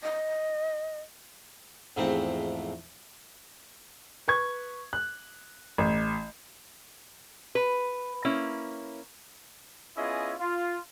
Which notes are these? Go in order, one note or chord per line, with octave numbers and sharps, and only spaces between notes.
D#5
E2 G#2 F3 A3 C4
B4 C#6 G#6
F#6
A1
B4
A#3 C#4 E4
B3 C#4 E4 F4 G#4 D#5
F4